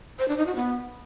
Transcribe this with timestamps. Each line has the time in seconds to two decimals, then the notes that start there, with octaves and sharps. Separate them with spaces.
0.19 C5
0.28 D4
0.37 D#4
0.47 F#4
0.56 B3